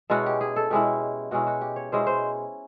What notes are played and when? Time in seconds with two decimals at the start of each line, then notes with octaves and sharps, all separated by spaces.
0.10 B2 G#3 C#4 E4 F#4
0.26 G4
0.41 G#4
0.56 A4
0.70 B2 G#3 C#4 E4 G4
1.31 B2 G#3 C#4 E4 F#4
1.47 F#4
1.61 G4
1.76 C#5
1.92 B2 G#3 C#4 E4 C5
2.07 C5